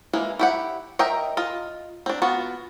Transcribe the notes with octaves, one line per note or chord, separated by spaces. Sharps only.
E3 G#3 A#3
E4 G4 F#5
A#4 D#5 E5 G5
F4 D#5
C4 D4
B3 F4 F#4